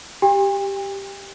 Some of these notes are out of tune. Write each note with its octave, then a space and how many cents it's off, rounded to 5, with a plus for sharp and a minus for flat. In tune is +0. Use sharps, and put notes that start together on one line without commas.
G4 +0 G5 +45